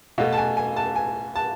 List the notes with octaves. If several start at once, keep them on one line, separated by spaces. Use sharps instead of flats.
B2 A3 F5
A5
G#5
G#5
A5
G#5
A5